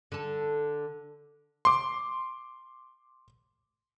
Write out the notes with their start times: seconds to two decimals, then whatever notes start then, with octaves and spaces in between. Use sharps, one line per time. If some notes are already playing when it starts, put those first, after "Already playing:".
0.12 D3 A4
1.65 C6 D6